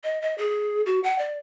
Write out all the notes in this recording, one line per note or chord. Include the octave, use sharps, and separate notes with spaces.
D#5
D#5
G#4
F#4
F#5
D5